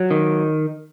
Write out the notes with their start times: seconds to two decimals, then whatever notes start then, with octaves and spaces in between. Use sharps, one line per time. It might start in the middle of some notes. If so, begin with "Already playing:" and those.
Already playing: F#3
0.11 D#3